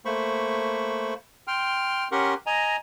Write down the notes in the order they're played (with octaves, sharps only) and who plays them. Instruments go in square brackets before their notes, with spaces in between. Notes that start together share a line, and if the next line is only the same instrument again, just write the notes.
[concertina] A3 A#3 C5 B5 C#6
G5 C6 F6
C#4 G4 A#4 F#5 C6 C#6
D#5 G#5 A#5